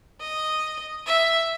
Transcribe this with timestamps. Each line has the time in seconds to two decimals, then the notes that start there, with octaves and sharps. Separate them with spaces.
0.20 D#5
1.06 E5